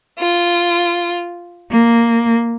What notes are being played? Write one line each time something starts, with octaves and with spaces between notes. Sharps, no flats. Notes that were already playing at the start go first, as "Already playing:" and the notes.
F4
A#3